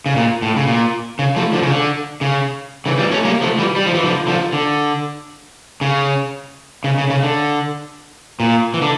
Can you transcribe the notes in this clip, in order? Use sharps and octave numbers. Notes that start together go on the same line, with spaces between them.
C#3
A#2
A2
C#3
A#2
C#3
F3 A3
D3 F3
C#3
D3
C#3
C#3 E3
E3 G3
A3 C#4
G3 A#3
F3 A3
E3 G3
G3
F3
E3
D3 F3
D3 F3
D3
C#3
C#3
C#3
C#3
D3
A#2
E3
D3